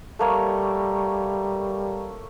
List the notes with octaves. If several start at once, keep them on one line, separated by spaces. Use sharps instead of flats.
G3 A3 A#3 C#5